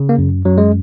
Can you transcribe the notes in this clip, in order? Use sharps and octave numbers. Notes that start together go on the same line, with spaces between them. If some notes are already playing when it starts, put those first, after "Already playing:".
Already playing: C#3
A#3
F#2
F#2 F#3
G#3